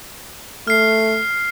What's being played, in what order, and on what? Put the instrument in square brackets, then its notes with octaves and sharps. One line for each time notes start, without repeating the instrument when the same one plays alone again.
[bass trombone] A3 [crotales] F6 C7